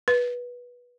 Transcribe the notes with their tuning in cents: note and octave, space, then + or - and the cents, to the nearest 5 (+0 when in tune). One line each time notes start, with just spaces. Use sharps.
B4 -15